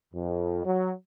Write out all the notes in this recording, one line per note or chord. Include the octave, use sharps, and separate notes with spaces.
F2
F#3